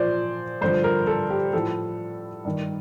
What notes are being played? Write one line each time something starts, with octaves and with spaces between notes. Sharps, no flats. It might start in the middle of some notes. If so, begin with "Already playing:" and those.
Already playing: A#2 F3 C5 D5
G2 D3 F3 C5
A#4
A4
G4
A2 F3 A4
G2 D#3